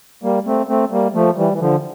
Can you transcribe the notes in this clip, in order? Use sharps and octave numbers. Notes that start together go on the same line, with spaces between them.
G3 A#3
A3 C4
A3 C4
G3 A#3
F3 A3
E3 G3
E3
D3 F3